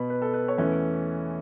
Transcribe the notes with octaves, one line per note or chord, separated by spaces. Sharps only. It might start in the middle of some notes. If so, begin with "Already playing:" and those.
Already playing: B2 B3 B5
B4
A4
B4
C#5
E2 E3 A3 C#4 B4